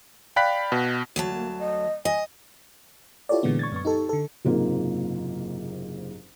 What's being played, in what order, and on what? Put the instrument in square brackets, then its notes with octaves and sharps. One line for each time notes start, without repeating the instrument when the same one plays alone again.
[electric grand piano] D5 F5 G5 B5 F#6 B6
B2
[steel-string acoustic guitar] D2 F#3 A5 [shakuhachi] F#4
[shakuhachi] A#3
D#5
[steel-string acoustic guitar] D#5 [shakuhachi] G#5
[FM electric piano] E4 F4 G4 A4 C#5 D5
A#2 D3 E3 G#3 B3
C#6 G#6 A6
F#2 B3 C#6
D#4 G4 A4
D3 A4
[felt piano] F#1 G#2 C3 A#3 F4 A#4